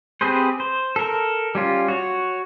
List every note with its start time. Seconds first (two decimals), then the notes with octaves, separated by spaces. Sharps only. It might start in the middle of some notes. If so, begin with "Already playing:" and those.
0.21 C4 G4 G#4 B4 C5
0.60 C5
0.96 A4 A#4
1.55 G3 C#4 F4
1.88 F#4 C#5